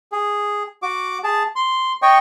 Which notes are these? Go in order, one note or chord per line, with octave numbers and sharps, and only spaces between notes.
G#4
F#4 D6
G#4 A5
C6
C#5 D#5 G5 C#6